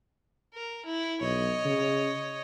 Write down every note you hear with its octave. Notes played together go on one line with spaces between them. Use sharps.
A#4
E4
B1 C#5 D#5
C#3